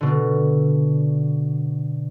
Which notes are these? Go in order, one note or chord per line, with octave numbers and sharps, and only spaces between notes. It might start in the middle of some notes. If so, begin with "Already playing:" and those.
B2 D3